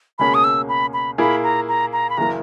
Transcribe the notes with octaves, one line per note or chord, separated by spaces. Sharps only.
C#2 B2 A#3 C#4 G#4 B5
D#6
E6
B5
B5
A#2 A#3 E4 G#4 B5
A#5
A#5
A#5
B5
F#1 E3 A#3 A#5